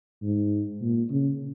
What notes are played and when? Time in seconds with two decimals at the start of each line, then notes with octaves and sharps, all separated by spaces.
0.22 G#2
0.82 A#2
1.11 C#3